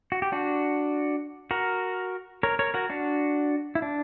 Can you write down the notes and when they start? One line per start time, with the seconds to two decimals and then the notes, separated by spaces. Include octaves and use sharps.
0.12 F#4
0.22 G4
0.32 D4 F#4
1.51 F#4 A#4
2.43 A#4 C#5
2.59 A#4 C#5
2.74 F#4 A#4
2.90 D4 F#4
3.75 E4
3.82 D4